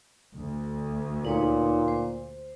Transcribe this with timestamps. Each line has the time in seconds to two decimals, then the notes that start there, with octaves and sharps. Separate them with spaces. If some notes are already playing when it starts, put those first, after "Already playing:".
0.38 D2
1.25 A#2 D#4 B4 C#5
1.88 C5